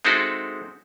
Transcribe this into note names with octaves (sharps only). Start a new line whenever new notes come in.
G#3 C4 D#4 E4 F#4 A4